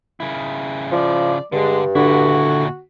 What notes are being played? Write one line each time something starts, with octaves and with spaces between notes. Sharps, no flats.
C#3 E4
F3 D5
G2 D3 G#3
A#2 D3 E4 F#4